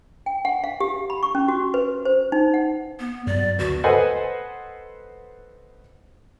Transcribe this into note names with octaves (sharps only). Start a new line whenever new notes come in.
G5
F#5
F5
G4
B5
C#6
C#4
F#4
B4
C5
D#4
F#5
B3
G2 F#3 D5
D2 D3 B3 F#4
A4 B4 C5 D#5 F#5 G#5